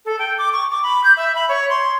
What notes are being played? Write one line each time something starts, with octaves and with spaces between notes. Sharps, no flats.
A4
G5
D6
C#6
D6
B5
G6
E5
B5
C#5
C6